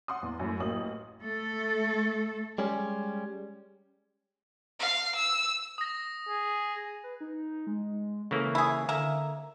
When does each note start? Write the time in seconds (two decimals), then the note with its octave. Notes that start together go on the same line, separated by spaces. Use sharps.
0.08 F#5 C6 D#6
0.23 E2
0.40 F#2 A2
0.60 A1 F#3 A#3 D#6 F#7
1.24 A3 A4
2.58 G3 G#3 C#4
4.80 F5
5.16 E6
5.78 D#6 A#6
6.29 G#4
7.04 B4
7.20 D#4
7.67 G#3
8.31 C#3 E3 A#3 A4
8.55 E4 G#4
8.89 D3 A#3 E5